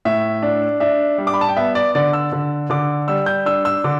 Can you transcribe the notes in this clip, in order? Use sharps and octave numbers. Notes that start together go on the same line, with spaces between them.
A2 E5
D4
D4 E5
G3
D6
B5
A5
G5
B3 E5
D5
D3 D5
E6
D3
D3 D6
G3 E6
G6
D4 E6
E6
D3 D6